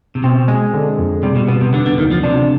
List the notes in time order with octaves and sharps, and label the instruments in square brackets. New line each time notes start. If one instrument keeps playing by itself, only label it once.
[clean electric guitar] C3
[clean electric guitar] B2 [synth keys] C4
[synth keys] G#3
D3
F2
[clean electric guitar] C3 [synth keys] G3
[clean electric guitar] B2
[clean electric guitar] B2 [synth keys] B3
[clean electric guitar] C3
[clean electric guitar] D3 [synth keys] B3
[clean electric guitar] D3
[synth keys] D2 [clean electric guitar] D#3
[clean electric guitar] F3
[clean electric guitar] C3 [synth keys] D4